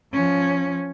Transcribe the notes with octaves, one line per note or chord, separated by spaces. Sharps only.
F3 C#4